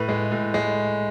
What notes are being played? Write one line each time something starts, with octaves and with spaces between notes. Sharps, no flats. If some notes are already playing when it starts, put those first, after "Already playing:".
Already playing: A2 B4
G#3
A2
G#3